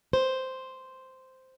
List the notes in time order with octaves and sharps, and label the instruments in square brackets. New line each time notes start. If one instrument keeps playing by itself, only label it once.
[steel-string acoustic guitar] C5